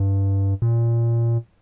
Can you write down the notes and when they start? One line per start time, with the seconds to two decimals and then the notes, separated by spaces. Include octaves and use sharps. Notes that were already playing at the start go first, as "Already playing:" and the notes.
Already playing: G2
0.62 A#2